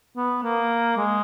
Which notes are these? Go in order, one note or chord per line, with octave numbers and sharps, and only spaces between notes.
B3
A#3
G#3